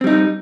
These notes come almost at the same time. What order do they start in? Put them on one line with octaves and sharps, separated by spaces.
C4 G3 D#4